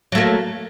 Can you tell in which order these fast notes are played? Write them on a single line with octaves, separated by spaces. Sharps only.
F#3 A3 A#3